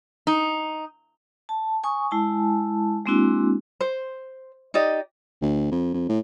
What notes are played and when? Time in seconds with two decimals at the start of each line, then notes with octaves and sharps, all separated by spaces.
0.27 D#4
1.49 A5
1.84 G#5 C#6 D#6
2.11 G#3 E4 G#5 A5
3.06 G#3 A#3 C4 D4 E4 F#4
3.81 C5
4.74 D#4 G4 D5 D#5
5.41 D2
5.71 F2
5.94 F2
6.09 A2